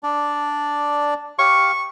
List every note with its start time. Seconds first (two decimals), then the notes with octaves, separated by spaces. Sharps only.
0.03 D4 D5
1.39 G4 F5 C#6